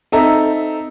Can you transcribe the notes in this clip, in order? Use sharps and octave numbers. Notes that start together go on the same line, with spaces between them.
C4 D#4 A4 E5 A#5